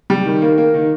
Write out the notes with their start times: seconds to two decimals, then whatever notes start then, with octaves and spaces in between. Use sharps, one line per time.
0.10 G3
0.26 D#3
0.42 A#3
0.58 A#3
0.74 D#3